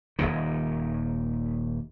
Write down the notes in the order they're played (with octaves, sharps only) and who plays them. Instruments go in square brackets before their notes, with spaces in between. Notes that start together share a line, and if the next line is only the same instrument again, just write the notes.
[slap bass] D#1 A#1 D#2 D#3